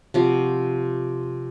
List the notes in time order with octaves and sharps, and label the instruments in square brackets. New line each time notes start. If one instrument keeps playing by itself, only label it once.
[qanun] C3 F3 F#4